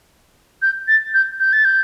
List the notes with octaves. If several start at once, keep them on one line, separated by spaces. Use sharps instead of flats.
G6
A6
G6
G6
A6
G6